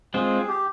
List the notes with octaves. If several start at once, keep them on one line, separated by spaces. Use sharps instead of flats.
G#3 C4 F4 G#4
G4